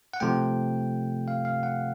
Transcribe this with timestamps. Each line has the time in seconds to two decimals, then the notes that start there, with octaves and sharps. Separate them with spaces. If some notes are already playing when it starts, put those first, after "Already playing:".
0.14 F#5
0.20 C3 F3 A3 G5
1.28 F5
1.45 F5
1.63 F#5